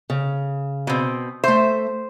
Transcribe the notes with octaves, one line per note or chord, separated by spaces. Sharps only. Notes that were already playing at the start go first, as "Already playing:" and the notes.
C#3
B2 C4
A3 C5 E5